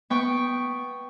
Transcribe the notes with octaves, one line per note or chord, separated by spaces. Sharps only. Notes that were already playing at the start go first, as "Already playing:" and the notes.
B3 G5 C#6